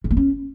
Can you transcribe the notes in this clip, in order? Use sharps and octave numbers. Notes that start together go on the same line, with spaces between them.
E3
A#3
C#4